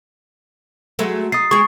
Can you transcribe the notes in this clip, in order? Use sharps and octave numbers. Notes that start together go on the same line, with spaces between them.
F#3 G#3 A3
D#4 D#6 A6 C7
G#3 G#4 C#6